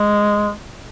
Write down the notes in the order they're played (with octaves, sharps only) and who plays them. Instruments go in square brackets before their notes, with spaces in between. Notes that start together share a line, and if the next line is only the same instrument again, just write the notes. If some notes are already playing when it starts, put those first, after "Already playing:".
Already playing: [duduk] G#3